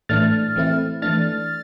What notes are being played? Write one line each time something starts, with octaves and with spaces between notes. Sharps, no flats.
A2 E3 A3 D4 F6 A6
E3 A3 C4 E4
E3 A3 D4 F6 A6